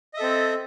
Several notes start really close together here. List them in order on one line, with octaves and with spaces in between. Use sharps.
D#5 E5 A4 C4